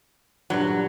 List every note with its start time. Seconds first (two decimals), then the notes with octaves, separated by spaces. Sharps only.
0.50 G2 A#2 D3 F#3